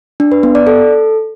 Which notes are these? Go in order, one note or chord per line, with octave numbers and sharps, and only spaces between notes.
D4
B4
B3
D5
A4